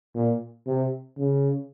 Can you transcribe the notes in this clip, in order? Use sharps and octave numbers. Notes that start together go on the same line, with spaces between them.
A#2
C3
C#3